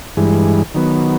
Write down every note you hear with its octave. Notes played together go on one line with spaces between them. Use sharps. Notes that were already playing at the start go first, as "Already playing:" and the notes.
G2 E3 G#3
D#3 F#3 B3